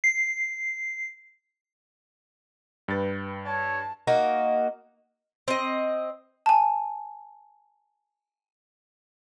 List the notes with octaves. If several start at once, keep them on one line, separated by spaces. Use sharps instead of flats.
C7
G2 B4 G5 A6
C#5 A5
A#3 D#4 F#4
C4 D#5
G#5 A5